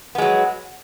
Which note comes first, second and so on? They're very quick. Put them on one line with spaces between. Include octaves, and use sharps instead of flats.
B3 G#3 F#3